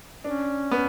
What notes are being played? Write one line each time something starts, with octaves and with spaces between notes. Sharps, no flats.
C#4 D4
B3